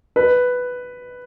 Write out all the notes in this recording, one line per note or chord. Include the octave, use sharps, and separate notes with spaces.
B4